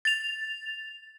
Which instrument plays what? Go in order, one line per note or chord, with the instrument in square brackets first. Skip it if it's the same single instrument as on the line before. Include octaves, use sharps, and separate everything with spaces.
[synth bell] A6 F7